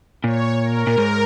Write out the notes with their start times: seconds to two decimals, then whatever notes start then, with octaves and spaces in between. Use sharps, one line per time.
0.24 A#2 C#5
0.60 A#4
0.87 A#2
0.98 G#2